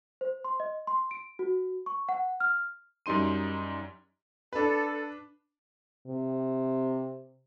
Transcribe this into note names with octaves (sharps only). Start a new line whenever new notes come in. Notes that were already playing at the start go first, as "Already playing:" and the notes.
C5
C6
D#5
C6
D7
F#4
C#6
F#5
F6
F#2 G3 D#4 C6 D#7
D4 A4 B4
C3